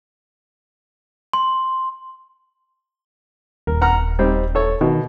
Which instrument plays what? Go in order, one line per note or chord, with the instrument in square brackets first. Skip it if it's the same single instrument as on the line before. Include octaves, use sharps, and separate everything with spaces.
[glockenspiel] C6
[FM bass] D#1 [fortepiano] A#4
[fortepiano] F#5 A#5 F6
G3 C4 D#4
A4 C#5
[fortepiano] B2 [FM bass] D#3